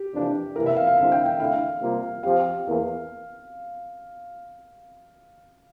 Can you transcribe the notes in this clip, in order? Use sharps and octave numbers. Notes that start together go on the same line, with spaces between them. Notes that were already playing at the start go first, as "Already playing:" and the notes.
Already playing: G4
F2 C3 E3 A#3 D4
C3 E3 A#3 E4 A#4
E5
F5
F5
D3 G3 C4 E4 F5
G5
G5
D3 A3 E4 F5
C3 G3 A#3 F4
F3 C4 G4 F5
E2 E3 A#3